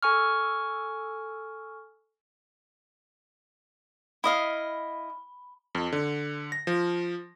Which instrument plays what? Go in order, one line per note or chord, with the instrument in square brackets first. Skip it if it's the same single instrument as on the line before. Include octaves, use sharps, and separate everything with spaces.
[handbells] A4 G#5 C#6 F6
[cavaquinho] E4 D#5 F5 [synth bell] B5
[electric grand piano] F2
D3
A#6
F3